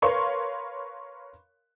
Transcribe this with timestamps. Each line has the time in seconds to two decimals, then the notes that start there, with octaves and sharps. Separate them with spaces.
0.02 A#4 B4 C#5 F5 C6 C#6